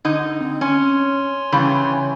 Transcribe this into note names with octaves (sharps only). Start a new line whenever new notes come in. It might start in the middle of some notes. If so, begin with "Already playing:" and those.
D3 D#4 D#5
C4
C#4 C#5 G#5 C6
C#3 E3 G3